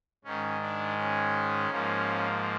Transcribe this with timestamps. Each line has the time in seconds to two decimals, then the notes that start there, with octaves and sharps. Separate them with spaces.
0.24 G#2 D#3 G#3 C#4
0.61 D4
0.97 C#4
1.70 G#2 F3 A#3